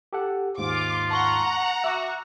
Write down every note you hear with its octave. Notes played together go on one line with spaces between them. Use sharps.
G4 A4 F#5
D#2 G#2 F4 D6
F#5 A5 A#5 C#6 G7
F#4 E5 C#6 D6 E6